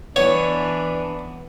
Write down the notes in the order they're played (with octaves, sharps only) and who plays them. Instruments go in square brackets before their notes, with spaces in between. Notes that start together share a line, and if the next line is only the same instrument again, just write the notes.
[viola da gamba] E3 [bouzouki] B3 [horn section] D4 [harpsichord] C#5